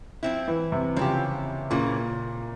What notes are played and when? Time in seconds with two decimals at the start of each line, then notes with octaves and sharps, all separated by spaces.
0.23 F3 C4 E4
0.48 E3
0.72 C3
0.96 C#3 F3 C4 G4
1.70 A#2 C#3 E3 A#3